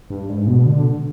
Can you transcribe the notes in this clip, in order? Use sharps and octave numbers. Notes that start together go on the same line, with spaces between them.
G2
G#2
B2
D3